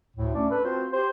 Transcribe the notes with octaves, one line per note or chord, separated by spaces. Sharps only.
D2 A2
A3 C#4 D4 D5
A4 B4
C4 F4 F#4 C5
G4 C5